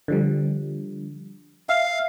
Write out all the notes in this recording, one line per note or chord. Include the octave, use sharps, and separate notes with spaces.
D3 F3 G3
E5 F5